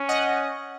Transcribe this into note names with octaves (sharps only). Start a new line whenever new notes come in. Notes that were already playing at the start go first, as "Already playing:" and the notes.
Already playing: C#4
D#5 F#5